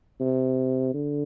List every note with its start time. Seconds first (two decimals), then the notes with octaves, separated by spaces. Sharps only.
0.20 C3
0.94 D3